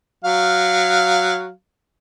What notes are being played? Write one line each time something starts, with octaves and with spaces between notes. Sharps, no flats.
F#3 F5